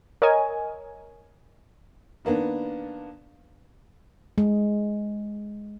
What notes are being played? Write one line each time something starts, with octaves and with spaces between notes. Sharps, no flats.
A#4 C#5 D#5 G#5
D#3 A#3 B3 D4
G#3